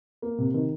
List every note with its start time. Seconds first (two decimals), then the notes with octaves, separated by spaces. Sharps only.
0.22 A#3
0.38 C3
0.54 D#3